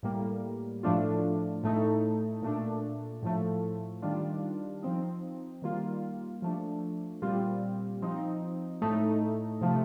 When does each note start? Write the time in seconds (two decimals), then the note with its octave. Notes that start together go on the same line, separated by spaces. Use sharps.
0.03 A2 G3 A#3
0.83 A2 F3 A3 D4 F4
1.63 A2 A3 D#4
2.42 A#2 A3 D4
3.23 A2 F3 A3
4.02 D#3 G3 D4 F4
4.82 F3 C4 D#4
5.62 D#3 G3 A#3 F4
6.42 F3 A3 D4
7.22 A#2 G3 C4 F4
8.02 F3 C4 D#4
8.82 A2 A3 D#4
9.61 C3 F3 A3